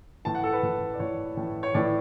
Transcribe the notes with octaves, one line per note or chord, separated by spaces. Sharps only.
A2 E3 A5
F#5
A4
B4
A2 E3
D5
A2 E3 C#5
A2 E3
C#5
A2 E3 D5